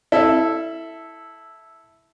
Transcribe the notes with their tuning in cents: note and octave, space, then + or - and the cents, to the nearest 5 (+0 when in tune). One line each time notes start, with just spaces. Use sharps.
E4 -5 A4 +0 F5 -45